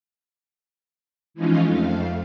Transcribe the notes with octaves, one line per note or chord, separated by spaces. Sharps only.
E3 F3 G#3 C#4 D#4 F4
F2 A3 F5